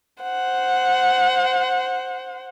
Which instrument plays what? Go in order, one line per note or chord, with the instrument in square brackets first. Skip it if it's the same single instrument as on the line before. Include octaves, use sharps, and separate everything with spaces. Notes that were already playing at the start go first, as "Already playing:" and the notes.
[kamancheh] C5 F#5